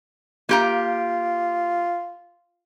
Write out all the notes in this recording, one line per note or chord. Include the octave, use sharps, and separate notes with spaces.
A#3 F4 G4 A#5